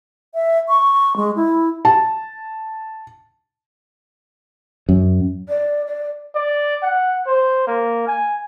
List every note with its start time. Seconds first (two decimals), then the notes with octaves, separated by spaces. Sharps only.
0.34 E5
0.68 C#6
1.16 G#3
1.36 E4
1.85 A5
4.89 F#2
5.49 D5
5.87 D5
6.35 D5
6.83 F#5
7.27 C5
7.67 A#3
8.07 G#5